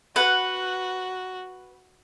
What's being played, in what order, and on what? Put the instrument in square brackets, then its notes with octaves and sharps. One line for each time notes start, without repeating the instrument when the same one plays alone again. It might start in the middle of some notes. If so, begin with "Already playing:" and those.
[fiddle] F#4 [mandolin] B4 F#5